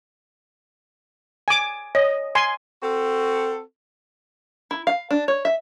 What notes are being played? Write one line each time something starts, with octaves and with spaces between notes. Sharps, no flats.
G#5 D6
C#5 D#5
G#5 C6
C4 F#4 A4
E4
F5
D4
C#5
E5